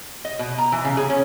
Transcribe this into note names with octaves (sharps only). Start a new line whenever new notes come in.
D#5
B2
A#5
E3
C#3
G#4
C#4